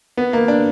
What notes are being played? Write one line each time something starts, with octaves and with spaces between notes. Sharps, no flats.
B3
A#3
D4